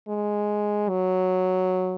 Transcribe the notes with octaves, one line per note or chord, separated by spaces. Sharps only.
G#3
F#3